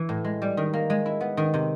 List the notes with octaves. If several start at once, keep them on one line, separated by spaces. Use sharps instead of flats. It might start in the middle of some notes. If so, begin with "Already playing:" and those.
Already playing: E3
A2
G#3
G3
D#3
A#3
G#3
E4
B3
D#3
C3